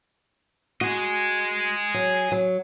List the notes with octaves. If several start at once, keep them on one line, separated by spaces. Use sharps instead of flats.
F#4 G#4 D#5
F#3
F#3